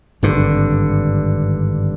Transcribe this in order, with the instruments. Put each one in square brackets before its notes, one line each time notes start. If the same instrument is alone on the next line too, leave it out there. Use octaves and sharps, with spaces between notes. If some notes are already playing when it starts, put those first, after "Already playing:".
[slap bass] G#1 G2 D3